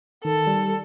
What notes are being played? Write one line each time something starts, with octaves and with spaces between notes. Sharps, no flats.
D#3 A4
G3